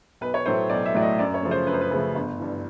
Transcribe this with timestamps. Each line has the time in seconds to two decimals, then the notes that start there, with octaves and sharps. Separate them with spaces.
0.21 B1 B4
0.34 C#5
0.46 A2 F#3 A3 C5
0.69 B1 D5
0.86 E5
0.94 A2 F#3 A3 D5
1.02 D#5
1.19 F#2 D5
1.34 C#5
1.43 C#3 F3 A3
1.51 C5
1.67 F#2 B4
1.74 C5
1.81 B4
1.91 C#3 F3 A3
2.15 G1
2.39 G2 E3